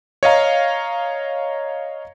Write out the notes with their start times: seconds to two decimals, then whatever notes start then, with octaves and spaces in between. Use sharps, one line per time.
0.23 C#5 D#5 F5 A#5